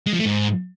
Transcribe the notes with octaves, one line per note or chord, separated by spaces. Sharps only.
G#3
F3
A3
G#2